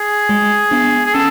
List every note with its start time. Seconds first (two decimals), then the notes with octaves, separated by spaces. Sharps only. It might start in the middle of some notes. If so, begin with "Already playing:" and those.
Already playing: G#4
0.29 G#3
0.71 B3 D4
1.06 G#4
1.14 C#4 A4